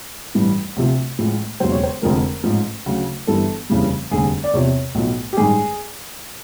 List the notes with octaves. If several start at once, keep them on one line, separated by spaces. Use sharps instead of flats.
A1 G2 E3 G3
D2 C3 F3
A1 A2 F3 G#3
E1 D#2 C#3 F#3 C5
C#5
C5
F1 F2 D3 F3 G#3 A#4
A1 G#2 F3
D2 C#3 F#3
G1 G2 E3 G3 A4
F1 D#2 C#3 E3 G3
F1 D#2 D3 G3 G#4
D5
E2 C3 F3 C#5
B1 A2 F3
G4
A1 G2 D#3 G#3 G#4